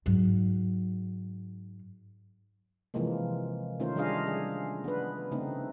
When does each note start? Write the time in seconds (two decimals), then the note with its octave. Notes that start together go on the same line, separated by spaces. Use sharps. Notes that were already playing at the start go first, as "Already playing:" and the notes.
0.06 G#2 F#3
2.94 C3 E3 F3 G#3 A#3
3.80 D#3 A3 C#4 D#4 F4 C5
3.96 G3 D4 F4 G#4 D#5 F5
4.27 G#4
4.84 B3 D4 B4
5.31 C#3 A3 C4 D#4